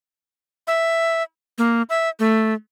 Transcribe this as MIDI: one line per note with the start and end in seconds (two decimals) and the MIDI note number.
0.67 1.23 76
1.58 1.82 58
1.90 2.09 76
2.19 2.54 57